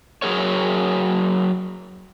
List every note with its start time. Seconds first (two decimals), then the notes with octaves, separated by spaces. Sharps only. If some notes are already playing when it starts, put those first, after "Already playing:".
0.22 F#3 G#4 A#4 C#5